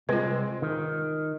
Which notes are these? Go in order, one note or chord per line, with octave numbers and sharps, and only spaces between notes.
C2 G#3 C4 F4 B4
D#3